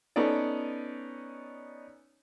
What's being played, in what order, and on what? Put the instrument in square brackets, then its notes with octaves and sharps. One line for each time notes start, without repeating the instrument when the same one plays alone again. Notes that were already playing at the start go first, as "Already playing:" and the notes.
[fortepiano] B3 C#4 D#4 A4 D5